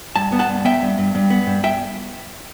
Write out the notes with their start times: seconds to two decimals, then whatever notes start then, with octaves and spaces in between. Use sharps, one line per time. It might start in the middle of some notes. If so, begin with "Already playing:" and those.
0.16 G2 A5
0.32 B3
0.39 F#5 A5
0.49 G2
0.65 B3 E5 G5
0.82 G2
0.98 G2
1.15 G2
1.30 B3
1.47 G2
1.64 E5 G5